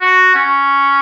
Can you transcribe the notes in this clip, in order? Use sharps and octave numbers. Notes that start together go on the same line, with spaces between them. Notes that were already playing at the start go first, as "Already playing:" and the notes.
F#4
C#4